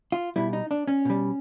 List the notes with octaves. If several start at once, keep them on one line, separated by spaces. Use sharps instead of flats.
F4
B2 G3 E4
D#4
D4
C#4
B2 G3